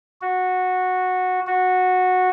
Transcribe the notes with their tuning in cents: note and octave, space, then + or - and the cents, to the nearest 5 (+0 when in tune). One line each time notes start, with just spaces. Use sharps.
F#4 -10
F#4 -10